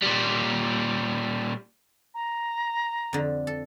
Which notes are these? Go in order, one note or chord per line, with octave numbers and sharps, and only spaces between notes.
A#2 G3
A#5
F2 D3
A4